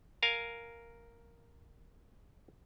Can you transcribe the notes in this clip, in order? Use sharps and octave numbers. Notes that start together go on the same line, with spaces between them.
A#4 F5 G#5